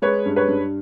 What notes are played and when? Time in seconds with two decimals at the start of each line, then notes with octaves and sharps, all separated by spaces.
0.02 G#3 B4 C#5
0.26 G2
0.36 B4 C#5
0.48 G2